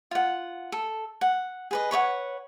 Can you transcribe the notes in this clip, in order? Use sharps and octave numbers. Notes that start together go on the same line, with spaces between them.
F4 F#5
A4
F#5
G#4 B4 D#5
B4 C#5 D#5 F#5